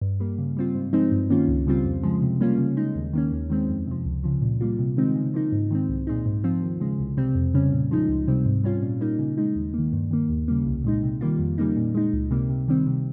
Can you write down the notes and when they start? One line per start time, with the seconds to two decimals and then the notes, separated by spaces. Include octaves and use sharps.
0.01 G2
0.20 G3 A#3
0.38 C#3
0.57 G3 C4 F4
0.75 G#2
0.93 F3 G#3 C4 D#4
1.12 G2
1.30 D#3 A#3 C#4 F4
1.48 C#2
1.67 C#3 G3 C4 F4
1.85 F2
2.03 C#3 F3 G#3
2.22 C3
2.40 G3 A#3 C#4 F4
2.58 C#3
2.77 G#3 D#4
2.95 D#2
3.13 D#3 A#3 C#4
3.32 D#2
3.50 D#3 G#3 C4
3.68 F2
3.87 C3 F3
4.05 C#2
4.24 C#3 F3
4.42 A#2
4.61 G3 A#3 F4
4.79 C3
4.97 D#3 G#3 C4 D#4
5.15 C#3
5.34 F3 A#3 D#4
5.52 G#2
5.70 D#3 G#3 C4
5.89 C2
6.07 A#2 G#3 D#4
6.26 G#2
6.44 F3 C4 F4
6.63 D#2
6.80 C#3 G#3
6.99 C2
7.17 C3 G3 C4
7.35 F2
7.54 C#3 G3 C#4
7.73 A#2
7.91 F3 G#3 D#4
8.09 C#2
8.27 C3 G3 C4
8.46 G#2
8.64 G3 C#4 F4
8.82 A#2
9.01 G3 A#3 D#4
9.19 C#3
9.38 G#3 D#4
9.56 D#2
9.74 D#3 A#3
9.93 G2
10.11 D#3 A#3
10.30 D#2
10.48 C#3 G3 A#3
10.66 C2
10.84 A#2 G#3 D#4
11.03 C3
11.21 D#3 G3 A#3 F4
11.39 F2
11.58 C#3 G3 A#3 D#4
11.76 A#2
11.95 G#3 D#4
12.13 C#2
12.31 C3 G3 A#3
12.49 C3
12.68 D#3 G3 C4
12.87 C3